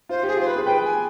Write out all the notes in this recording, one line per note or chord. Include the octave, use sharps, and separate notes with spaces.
F4 C5
G4 G#4
F4 C5
B4
G#4
B4 G5
G#5